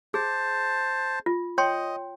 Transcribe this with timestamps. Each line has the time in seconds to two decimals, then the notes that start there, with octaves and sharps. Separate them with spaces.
0.14 G#4 C5 A5
1.26 F4
1.58 C#5 D#5 G5 C6